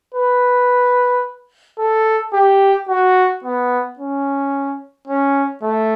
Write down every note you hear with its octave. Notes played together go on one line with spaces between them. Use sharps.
B4
A4
G4
F#4
B3
C#4
C#4
A3